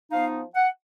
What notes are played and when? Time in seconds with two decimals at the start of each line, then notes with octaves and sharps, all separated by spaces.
0.11 F3 B3 D#4 F5
0.55 F#5